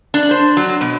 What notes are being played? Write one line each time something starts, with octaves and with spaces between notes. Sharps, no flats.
D4
C5
F#3
B2